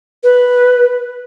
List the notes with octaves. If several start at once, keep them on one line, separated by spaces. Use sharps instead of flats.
B4